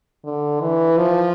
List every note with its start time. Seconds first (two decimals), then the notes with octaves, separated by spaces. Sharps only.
0.25 D3
0.60 E3
0.98 F3